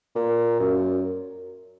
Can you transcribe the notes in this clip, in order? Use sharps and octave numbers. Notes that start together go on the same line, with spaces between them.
A#2
F#2